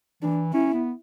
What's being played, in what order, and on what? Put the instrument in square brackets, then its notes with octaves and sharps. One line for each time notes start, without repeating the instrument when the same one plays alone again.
[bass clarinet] E3 [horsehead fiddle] D4
[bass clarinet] C#4 [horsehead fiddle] E4
[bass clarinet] B3